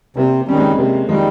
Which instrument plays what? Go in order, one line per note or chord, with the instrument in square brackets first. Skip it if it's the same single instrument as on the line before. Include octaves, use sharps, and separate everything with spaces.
[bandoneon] C3 [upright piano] G3 A#3
[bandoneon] D#3 G3 [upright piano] C#4
[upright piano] G#3 C4
[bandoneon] C3 [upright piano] G3 A#3
[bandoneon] D#3 G3 [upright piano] F3 G#3